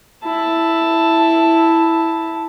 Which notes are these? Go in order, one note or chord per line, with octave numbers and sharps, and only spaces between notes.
E4 A5